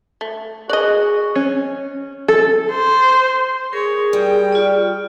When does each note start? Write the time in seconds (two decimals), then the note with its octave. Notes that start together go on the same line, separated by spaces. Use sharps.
0.21 A3
0.69 F#4 G#4 D5 D#5
1.35 C#4
2.28 A4
2.73 C5
3.73 G#4 A#4 C#5
4.13 G3 G5
4.52 F4 D5